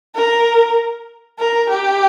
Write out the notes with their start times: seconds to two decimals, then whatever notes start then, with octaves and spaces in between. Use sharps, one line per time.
0.15 A#4
1.39 A#4
1.70 G4